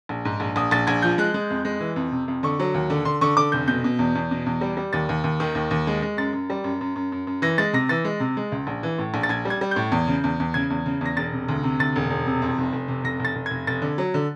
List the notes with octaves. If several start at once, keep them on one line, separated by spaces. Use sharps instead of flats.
A#1
G#2
A#1
A#1 D#6
A#1 A6
A#1 G#6
F3 G6
G#3 F#6
G#3
F2
G#3
E3
F2
C3
F2
D3 C#6
F#3
D#2
D3
D3 C6
D3 C#6
D3 D6
F1 G6
B2 G6
B2
E2
E2
B2
E2
G3
G3
D#2 A6
D#2
D#2
D#3
D#2
D#2
G#3
G#3
F#2 A6
F#2
G3
F#2
F#2
F#2
F#2
F#2
E3 A#6
G#3 A6
C3 A#6
E3 A6
G#3
C3
G#3
C#2
A#1
E3
A2
A#1
A6
A#1 G#6
G3
G#6
G3
A2 G6
E2
C#3
E2
E2
C#3 G#6
E2
C#3
E2 A#6
E1 A6
C3
D2
C3
D2 A6
E1
E1
C3
F2
F1
F1
C3
F1 A#6
F1
A6
F1
F1 G#6
F1 A6
D3
F#3
D3